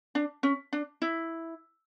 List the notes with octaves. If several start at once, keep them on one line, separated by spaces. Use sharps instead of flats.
D4
C#4
D4
E4